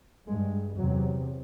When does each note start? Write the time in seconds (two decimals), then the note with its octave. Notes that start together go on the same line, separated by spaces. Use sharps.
0.27 G2 G#3
0.78 E2 C3 F#3